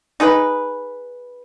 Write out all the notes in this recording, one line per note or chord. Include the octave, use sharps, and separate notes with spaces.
D#4 G#4 B4